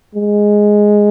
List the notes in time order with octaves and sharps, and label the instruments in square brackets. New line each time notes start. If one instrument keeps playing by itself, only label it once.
[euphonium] G#3